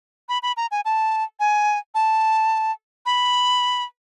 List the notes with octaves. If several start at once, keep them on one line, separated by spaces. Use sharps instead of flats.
B5
B5
A#5
G#5
A5
G#5
A5
B5